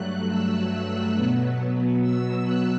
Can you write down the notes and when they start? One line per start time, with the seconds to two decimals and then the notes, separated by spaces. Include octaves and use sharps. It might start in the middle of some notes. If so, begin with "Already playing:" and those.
Already playing: G2 F#3 A3 F#6
0.30 E6
1.16 B2 F#3 B3
2.02 E6
2.45 F#6